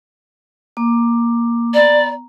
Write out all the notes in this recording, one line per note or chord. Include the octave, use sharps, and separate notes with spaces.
A#3 D6
B3 D5 A#5